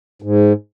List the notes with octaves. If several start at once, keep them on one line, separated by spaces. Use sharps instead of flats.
G#2